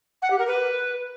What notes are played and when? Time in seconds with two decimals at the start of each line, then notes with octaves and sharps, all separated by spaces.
0.22 F#5
0.30 G4
0.39 A#4
0.47 B4